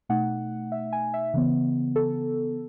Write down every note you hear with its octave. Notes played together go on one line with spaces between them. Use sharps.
B2 A3 D#4 F#5
E5
G#5
E5
C#3 E3 B3
A4